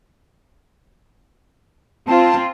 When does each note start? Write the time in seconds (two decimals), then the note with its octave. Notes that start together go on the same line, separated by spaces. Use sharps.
2.07 C4 F4 A5